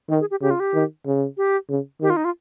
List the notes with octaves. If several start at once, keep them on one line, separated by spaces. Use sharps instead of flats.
D#3 A#4
G#4
G4
C#3 G4
F4
G4
D#3
C#3
G4
C#3
D#3 G4
F4
D#4
F4